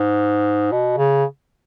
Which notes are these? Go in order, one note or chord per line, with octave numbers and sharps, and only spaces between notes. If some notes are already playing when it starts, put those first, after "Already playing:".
Already playing: G#2
B2
C#3